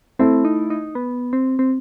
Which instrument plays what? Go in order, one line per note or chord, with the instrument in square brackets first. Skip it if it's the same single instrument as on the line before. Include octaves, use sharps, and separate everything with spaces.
[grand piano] A3 E4 A4 [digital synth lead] C4
[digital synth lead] D#4
D#4
B3
C4
C4